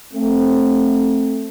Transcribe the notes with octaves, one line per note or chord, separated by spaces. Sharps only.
A3 C4